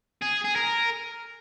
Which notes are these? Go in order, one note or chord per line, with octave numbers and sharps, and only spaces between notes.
G#4
G#4
A#4